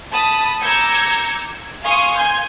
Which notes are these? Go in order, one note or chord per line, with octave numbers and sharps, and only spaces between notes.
A5 B5 D#6
A#5 D6 E6 G6 G#6 C#7
F5 G#5 C6 C#6 D#6
G#5 C6 G6 G#6